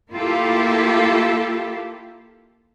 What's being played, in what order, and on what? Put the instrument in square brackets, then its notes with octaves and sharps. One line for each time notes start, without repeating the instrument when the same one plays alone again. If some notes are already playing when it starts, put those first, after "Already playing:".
[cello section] A#3 E4 F4 G4 A4